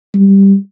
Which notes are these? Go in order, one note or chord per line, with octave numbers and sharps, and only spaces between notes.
G3